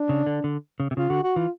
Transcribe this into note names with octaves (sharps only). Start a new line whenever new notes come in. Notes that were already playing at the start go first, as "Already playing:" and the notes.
Already playing: D4
C#3
D3
D3
C#3
C3
C#3 F4
D3 F#4
F#4
E3 F4